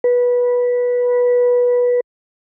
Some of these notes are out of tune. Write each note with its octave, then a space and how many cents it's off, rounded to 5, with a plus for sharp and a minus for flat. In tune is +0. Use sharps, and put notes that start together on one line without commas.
B4 -15